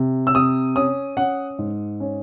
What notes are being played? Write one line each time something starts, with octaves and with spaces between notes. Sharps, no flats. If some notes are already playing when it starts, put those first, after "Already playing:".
Already playing: C3
E6
C3 D#6
C#4 D#6
C#4 F#5
G#2
C#4